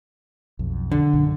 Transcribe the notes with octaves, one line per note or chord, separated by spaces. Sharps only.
B1 F2
D3
A#1 F#2